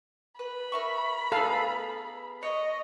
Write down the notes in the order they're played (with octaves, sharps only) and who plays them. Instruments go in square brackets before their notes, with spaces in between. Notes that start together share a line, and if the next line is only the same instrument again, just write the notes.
[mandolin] B4 [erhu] B5
[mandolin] A#4 E5 C#6
[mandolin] B3 E4 G#4 [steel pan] A4 F5
[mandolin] C#5 [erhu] D#5